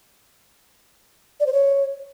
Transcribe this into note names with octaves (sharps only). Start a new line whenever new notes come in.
D5
C5
C#5